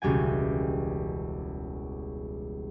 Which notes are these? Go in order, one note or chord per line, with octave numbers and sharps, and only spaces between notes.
E1 C#2 G3 G5 G#5